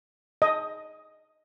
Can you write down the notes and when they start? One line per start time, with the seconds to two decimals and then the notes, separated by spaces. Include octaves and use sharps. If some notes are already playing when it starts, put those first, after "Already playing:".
0.42 D#5